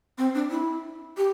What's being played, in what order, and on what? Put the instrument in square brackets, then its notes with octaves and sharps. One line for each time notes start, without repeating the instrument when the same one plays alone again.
[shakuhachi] C4
D4
E4
G4